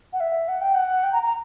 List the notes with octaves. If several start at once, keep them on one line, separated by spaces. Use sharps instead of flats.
F#5
E5
F#5
G5
F#5
G5
A#5
A#5